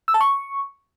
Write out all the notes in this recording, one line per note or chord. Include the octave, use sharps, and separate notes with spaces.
E6
A5
C#6